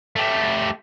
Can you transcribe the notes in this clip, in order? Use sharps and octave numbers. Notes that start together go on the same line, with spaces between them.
A3 G4